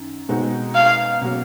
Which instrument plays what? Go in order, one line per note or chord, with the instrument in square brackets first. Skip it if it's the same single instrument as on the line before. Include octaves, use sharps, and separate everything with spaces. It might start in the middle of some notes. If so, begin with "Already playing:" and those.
Already playing: [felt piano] F#2 D#3
B2 G#3 C4 D#4 F#4
[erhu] F5
[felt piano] B2 F#3 A#3 C#4 F#4